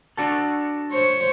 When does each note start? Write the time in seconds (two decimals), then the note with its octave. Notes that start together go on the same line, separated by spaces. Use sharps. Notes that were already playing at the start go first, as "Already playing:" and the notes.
0.17 D4 F#4 A4
0.92 C5 C#5